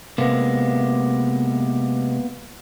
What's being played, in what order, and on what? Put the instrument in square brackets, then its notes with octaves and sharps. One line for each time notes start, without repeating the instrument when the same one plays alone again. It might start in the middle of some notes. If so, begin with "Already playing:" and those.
[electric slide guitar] C3 G#3 [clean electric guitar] A#3 B3